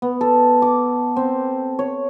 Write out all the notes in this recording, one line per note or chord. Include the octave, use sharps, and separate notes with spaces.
B3
A4
D6
C4
C#5